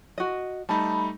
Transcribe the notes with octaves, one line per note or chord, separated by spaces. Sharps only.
F#4 D#5
G3 A3 D#4 A5 B5